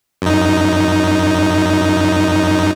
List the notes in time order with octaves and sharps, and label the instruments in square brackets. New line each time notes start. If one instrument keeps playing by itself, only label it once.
[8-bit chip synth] F#2 D#4